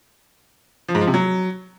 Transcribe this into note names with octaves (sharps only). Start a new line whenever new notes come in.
F3
G#2
F3
C3
F#3